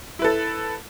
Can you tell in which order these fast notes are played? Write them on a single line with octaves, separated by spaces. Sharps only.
E4 B4 A4